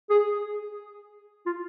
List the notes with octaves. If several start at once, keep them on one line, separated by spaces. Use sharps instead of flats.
G#4
F4